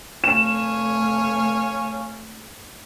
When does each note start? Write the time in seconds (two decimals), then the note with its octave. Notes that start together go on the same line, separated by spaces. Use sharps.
0.24 F1 A3 C#5 F5 G#5 E7